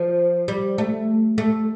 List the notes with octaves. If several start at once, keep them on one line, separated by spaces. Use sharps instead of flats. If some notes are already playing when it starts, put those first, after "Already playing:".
Already playing: F3
G3
A3
A3